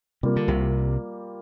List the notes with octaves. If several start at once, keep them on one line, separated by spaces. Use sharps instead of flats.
C3 G3 A#3 F4
D3
C2 C3